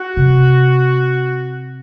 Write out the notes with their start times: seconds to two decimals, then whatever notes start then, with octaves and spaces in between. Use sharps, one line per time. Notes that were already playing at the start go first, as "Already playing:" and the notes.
Already playing: F#4
0.17 C3